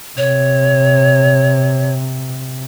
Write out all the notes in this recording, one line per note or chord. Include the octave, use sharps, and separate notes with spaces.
C3 C#5